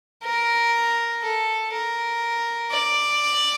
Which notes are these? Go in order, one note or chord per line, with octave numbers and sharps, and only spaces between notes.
A#4
A4
A#4
D5